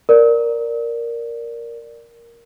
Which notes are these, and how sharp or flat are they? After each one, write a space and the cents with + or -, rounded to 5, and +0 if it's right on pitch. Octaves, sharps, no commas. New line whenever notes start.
A#4 +0 D5 +0